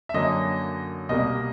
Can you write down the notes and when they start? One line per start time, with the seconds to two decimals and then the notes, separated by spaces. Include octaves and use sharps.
0.09 E5
0.14 F#2 D3 F#3 A#3 D#5
1.09 C2 B2 G3 A#3 D#5